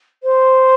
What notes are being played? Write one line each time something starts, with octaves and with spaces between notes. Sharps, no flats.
C5